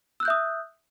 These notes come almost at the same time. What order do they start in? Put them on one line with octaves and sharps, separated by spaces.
E6 F#6 G6 E5 D#6